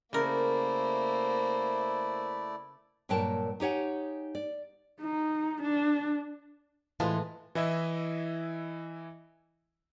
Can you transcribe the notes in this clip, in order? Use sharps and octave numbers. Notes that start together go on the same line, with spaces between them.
C#3 A3 A#3 E4 A#4 C5 D5
G2 A#2 F#3 A#4 G5 A5
D#4 G4 C#5 F#5 G#5
D5
D#4
D4
A2 E3 F3 G#3 A4 A5
E3 E4 D#5 E5